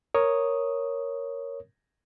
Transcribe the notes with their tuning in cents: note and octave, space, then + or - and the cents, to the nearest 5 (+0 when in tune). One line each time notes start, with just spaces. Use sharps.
A#4 +0 C#5 +0 D#6 +0